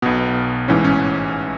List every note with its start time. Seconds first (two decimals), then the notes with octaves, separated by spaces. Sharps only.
0.02 B1 B2 B3
0.68 A1 G#2 E3 C#4
0.84 C#4